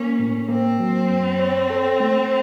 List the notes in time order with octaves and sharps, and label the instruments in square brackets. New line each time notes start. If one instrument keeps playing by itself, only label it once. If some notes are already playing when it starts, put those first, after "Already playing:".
Already playing: [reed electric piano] A#3 [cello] C#4
[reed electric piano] A2
[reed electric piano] A#3 [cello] C4
[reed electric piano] F#3
F#2
C#5
A4
A3